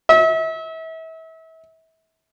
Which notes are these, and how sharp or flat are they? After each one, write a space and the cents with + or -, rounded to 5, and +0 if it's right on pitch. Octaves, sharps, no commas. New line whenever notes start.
E5 -35